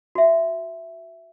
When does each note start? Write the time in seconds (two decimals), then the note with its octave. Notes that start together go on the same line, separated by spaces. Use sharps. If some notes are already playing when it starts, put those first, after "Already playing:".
0.15 F#4 E5